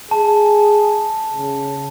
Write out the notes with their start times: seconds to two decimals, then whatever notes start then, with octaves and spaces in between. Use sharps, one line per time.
0.11 G#4 A5
1.34 C#3